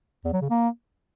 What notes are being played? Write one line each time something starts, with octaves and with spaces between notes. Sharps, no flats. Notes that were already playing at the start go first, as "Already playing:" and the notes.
E2
F#3
C#3
A#3